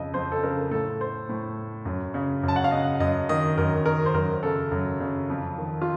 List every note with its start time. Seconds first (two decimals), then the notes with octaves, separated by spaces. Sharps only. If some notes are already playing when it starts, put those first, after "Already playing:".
Already playing: F2 C#3 D#5
0.14 F2 C5
0.32 A4
0.43 C#3 A#4
0.71 A2 A4
1.01 C5
1.29 A2
1.85 F#2
2.14 C#3
2.43 F#2
2.48 A5
2.56 F#5
2.64 F5
2.71 C#3 D#5
3.00 F#2 D#5
3.29 D#3 D#5
3.58 F#2 A#4
3.86 D#3 A#4
4.06 C5
4.14 F#2 A#4
4.43 C#3 A4
4.71 F#2
5.00 C#3
5.30 F2
5.58 D#3
5.82 F4